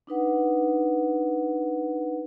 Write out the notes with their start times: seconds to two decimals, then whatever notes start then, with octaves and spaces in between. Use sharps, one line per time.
0.07 D4 D#4 B4 F#5